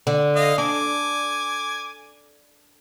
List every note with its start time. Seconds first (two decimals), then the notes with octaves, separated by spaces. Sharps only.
0.07 D3
0.35 D#5 F5
0.58 D4 G#5 D6